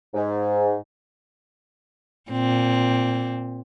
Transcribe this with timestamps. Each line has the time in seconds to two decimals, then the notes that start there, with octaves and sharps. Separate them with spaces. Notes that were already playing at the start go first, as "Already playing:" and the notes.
0.14 G#2
2.31 A#2 C4